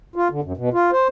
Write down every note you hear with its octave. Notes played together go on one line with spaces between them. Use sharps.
F4
D3
F#2
B2
F4
C5